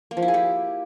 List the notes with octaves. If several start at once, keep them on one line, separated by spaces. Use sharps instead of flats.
A#3
F3
E4
G#4
G4